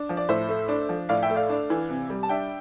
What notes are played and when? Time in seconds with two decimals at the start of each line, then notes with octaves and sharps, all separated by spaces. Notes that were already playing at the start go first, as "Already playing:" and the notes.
Already playing: D4
0.09 F3
0.17 D5
0.29 A2 C5 E5
0.49 A3
0.68 D4
0.89 F3
1.09 A2 D5 F5
1.22 E5 G5
1.30 A3
1.35 D5 F5
1.50 D4
1.70 E3
1.90 C3
2.10 G3
2.23 A5
2.29 D4 E5 G5